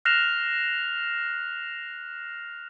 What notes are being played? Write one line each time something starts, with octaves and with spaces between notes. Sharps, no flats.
F6 F#6 A#6 C7 E7 F7